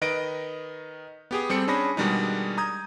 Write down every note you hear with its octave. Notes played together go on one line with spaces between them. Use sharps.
D#3 B4 D#5 A#6 D7
B3 G4 G#4
G3 C4 A4 C#7
C#4 D4 G#4 B5 A#6
B2 D#3 G3 G#3 D4 D#4
A#5 D#6 G6 G#6